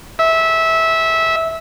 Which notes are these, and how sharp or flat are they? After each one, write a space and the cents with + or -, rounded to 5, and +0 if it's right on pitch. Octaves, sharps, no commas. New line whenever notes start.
E5 -15